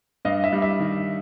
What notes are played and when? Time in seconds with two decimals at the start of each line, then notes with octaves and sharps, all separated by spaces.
0.25 G2 D#5 F5
0.44 E5
0.53 G3
0.62 E5
0.80 D#3